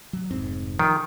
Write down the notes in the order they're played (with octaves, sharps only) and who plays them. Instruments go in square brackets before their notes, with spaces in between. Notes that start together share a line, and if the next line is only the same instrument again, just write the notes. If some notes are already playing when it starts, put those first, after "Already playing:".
[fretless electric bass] F#3
F1 G#2 C4
[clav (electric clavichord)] D#3 [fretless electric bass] F3